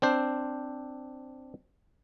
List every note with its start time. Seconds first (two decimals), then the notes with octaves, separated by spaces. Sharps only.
0.02 C4 D4 C5